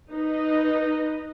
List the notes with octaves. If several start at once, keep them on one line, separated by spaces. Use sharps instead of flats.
D#4 B4 D#5